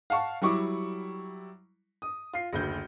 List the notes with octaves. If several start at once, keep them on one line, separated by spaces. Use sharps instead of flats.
F5 F#5 A5 C#6
F#3 G3 E4 C#6 D6
D#6
F4 C7
F#1 D2 G6